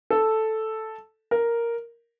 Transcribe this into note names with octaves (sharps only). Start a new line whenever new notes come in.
A4
A#4